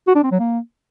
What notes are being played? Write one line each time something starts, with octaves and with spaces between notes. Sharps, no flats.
F#4
D4
C4
F#3
A#3